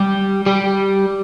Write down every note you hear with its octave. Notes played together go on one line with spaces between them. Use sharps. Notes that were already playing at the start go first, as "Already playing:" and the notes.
Already playing: G3 G4
G3 G4